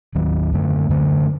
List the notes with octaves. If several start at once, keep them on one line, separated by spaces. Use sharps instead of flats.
D#2 D#3 F#3
F#2 D3 A3
F#2 D3 A3